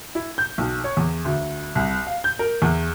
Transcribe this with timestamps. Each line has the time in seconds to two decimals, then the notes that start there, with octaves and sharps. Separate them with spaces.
0.15 E4
0.38 G6
0.58 B1
0.84 C#5
0.97 E2
1.25 D2
1.75 C2
2.07 F5
2.24 G6
2.39 A#4
2.62 E2